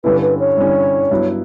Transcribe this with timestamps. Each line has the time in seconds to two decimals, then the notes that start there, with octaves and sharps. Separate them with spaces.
0.04 G2 D3 G3 C#4 E4 B4
0.22 B4
0.40 C#5
0.57 G2 D3 G3 C#4 E4
1.11 G2 F#3 B3 E4